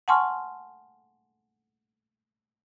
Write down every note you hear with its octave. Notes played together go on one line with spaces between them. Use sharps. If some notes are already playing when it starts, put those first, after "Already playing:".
F#5 G#5 A5 C6 C#6 F6